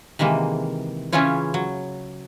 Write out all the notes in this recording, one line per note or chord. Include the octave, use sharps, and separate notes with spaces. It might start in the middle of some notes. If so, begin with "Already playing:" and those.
C3 D#3 E3 G#3 A#3
C#3 E3 C#4 E4 F4 C#5
F#3